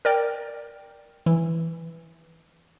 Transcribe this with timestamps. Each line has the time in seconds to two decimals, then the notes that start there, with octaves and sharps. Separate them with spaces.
0.05 A#4 D5 G5
1.26 E3